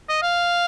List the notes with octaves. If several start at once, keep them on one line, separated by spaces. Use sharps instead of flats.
D#5
F5